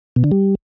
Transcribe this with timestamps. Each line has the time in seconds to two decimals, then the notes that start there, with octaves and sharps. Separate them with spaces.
0.16 B2
0.24 D3
0.32 G3